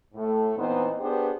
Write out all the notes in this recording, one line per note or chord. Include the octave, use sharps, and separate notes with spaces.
A2 A3
A#2 E3 B3 C4 D#4 C5
B3 D4 G4 G#4 B4 C5